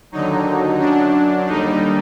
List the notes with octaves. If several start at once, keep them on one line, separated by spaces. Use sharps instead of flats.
D#2 D3 F#3 D#4
F#2 F#3 D4
D#2 D3 G3 D#4